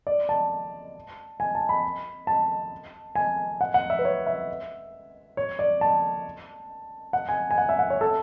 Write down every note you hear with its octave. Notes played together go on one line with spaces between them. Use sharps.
D5
A5
G#5
A5
B5
A5
G#5
F#5
F#5
E5
B4
C#5
E5
C#5
D5
A5
F#5
G#5
G#5
F#5
E5
F#5
C#5
A4